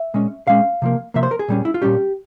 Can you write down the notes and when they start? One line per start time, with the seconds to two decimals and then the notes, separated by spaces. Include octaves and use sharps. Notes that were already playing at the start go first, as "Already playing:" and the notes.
Already playing: E5
0.14 A#2 G#3 C#4
0.47 A#2 G#3 C#4 F5
0.82 C3 F3 A#3
1.14 C3 F3 A#3 E5
1.23 C5
1.31 A#4
1.39 G#4
1.48 A#2 G3 C#4
1.65 E4
1.74 F4
1.82 A#2 G3 C#4 G4